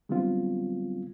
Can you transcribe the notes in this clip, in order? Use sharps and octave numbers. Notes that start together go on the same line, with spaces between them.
D3 F#3 G3 B3 C4 F4